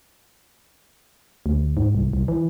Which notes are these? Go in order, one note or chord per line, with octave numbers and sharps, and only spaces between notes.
D2
G#2
C2
C2
E3